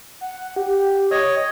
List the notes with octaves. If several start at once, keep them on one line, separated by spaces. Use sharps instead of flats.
F#5
G4
C#5 D#5 D#6